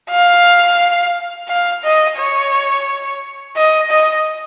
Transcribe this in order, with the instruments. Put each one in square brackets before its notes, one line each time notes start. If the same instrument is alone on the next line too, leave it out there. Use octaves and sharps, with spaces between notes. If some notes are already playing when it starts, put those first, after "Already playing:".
[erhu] F5
F5
D#5
C#5
D#5
D#5